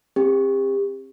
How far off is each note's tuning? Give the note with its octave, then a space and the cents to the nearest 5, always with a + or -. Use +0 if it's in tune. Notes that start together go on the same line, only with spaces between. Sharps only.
C4 +30 G4 +35